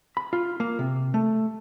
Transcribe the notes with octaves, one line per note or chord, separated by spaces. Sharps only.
B5
F4
A#3
C3
A3